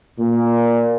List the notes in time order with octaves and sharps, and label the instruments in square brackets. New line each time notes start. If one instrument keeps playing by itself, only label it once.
[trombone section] A#2